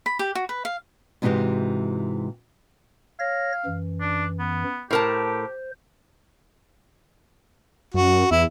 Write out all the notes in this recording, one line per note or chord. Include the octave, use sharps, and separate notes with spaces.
B5
G4
F#4
B4
F5
G#2 C3 E3 G#3 F#4 G4
C#5 F5 A#6
F#2 E3
D4
B3
A2 G4 A#4 C5 A5
F#2 F#4
E2 E4